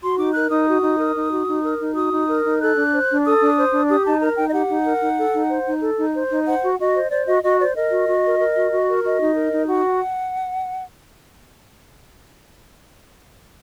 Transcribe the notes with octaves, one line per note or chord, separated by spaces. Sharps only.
F#4 C6
D#4 D6
A#4 F#6
D#4 D#6
F#4
D#4
A#4
D#4
F#4
D#4
A#4
D#4
F#4 D#6
D#4
A#4
D#4
A4 F#6
D4
C5
D4
A4 D#6
D4
C5
D4
G4 D#6
D#4 A5
A#4 A#5
D#4 G5
D#5
G4 F#5
D#4
A#4
D#4
A4
D#4
C5
D#4
A4
D#4
C5
D#4
C5 F#5
F#4
F#4 D#5
C5
C5 D5
F#4 D#5
F#4 D#5
C5 D5
A#4 D#5
F#4
F#4
A#4
A#4
F#4
F#4
A#4
F#4 D#5
D#4
A#4
D#4
F#4 F#5